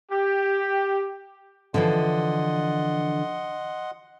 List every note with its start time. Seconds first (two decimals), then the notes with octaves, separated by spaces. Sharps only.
0.11 G4
1.74 D3 E3 F3 D#5 F#5 C6